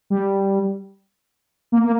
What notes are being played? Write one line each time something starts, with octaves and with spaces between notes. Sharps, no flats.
G3
A#3
A#3